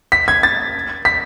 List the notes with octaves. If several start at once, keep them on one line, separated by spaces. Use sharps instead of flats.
B6
G#6
A6
B6